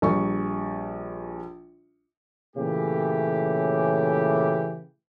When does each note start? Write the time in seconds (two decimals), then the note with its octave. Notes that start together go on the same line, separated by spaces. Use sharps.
0.02 A#1 G3 C#6
2.56 A#2 C#3 E3 A3 C#4 G4